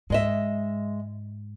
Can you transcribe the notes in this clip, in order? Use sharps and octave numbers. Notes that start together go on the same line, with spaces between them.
G#2 G#3 D#5 E5